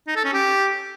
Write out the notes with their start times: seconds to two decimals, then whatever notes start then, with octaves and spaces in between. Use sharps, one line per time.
0.07 D#4
0.16 A4
0.25 C#4
0.33 G4